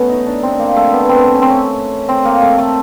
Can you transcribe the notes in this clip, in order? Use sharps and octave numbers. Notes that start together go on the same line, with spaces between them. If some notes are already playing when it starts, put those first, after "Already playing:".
Already playing: A3 B3 C#4
D#4
D4
C4
A#3
A3
B3
C4
C#4
C4
C#4
C4
A#3
A3
A3